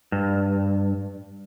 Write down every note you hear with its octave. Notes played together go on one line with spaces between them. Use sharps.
G2